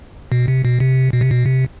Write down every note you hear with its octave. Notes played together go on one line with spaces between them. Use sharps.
B2
C3
B2
C3
B2
C3
B2
C3